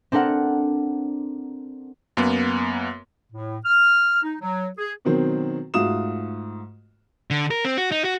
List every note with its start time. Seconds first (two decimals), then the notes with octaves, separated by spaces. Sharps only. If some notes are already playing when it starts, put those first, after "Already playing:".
0.12 C4 D4 A4 A#4 F#5
2.17 F#2 A#3 B3
3.33 A2
3.65 F6
4.23 D#4
4.41 F#3
4.78 G#4
5.05 B2 D#3 F#3 C4
5.74 G#2 A3 F4 F#4 D#6 E7
7.30 D3
7.51 A#4
7.65 C4
7.78 F#4
7.92 D#4
8.04 F#4